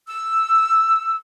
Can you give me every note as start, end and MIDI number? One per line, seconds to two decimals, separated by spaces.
0.08 1.16 88